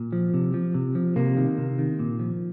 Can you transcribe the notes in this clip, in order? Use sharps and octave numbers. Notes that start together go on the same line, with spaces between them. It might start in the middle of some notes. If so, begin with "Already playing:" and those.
Already playing: A#2
F3
C3
F3
C3
F3
C3 A#3
D#3
C3
D#3
A#2
F3